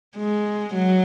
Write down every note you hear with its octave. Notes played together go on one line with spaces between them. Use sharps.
G#3
F#3